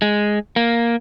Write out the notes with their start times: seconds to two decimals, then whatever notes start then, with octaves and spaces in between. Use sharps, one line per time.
0.02 G#3
0.56 A#3